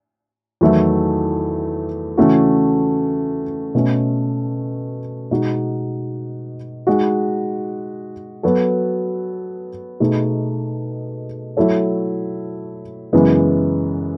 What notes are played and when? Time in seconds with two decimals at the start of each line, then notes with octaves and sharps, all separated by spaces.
0.61 E2 D#3 F#3 A3 E4
2.17 C#3 E3 A3 C#4 F#4
3.75 B2 A3 C#4
5.31 B2 G#3 D#4 F#4
6.87 G#3 D#4 F#4
8.43 F#3 B3 F#4 A4
10.00 B2 A3 D#4 G#4
11.57 F#3 A3 E4 A4 C#5
13.13 F#2 C#3 E3 G#3 B3